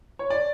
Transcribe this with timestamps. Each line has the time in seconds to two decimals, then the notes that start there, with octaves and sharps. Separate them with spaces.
0.19 C#5
0.30 D5